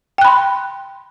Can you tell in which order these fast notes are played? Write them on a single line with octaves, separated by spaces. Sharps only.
G5 F#6 B5 C6